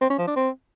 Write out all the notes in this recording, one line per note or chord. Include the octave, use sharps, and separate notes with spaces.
C4
C#4
F3
D4
C4